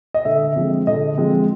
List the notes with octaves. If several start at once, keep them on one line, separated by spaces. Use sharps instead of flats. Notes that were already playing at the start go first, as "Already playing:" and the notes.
D#5
D3 E5
F3 G#3 C4
D3 D#5
F3 G#3 C4